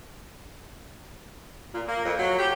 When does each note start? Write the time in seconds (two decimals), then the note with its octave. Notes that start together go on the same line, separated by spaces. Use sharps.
1.74 A#2
1.88 A#3
2.05 F2
2.19 F#3
2.38 G4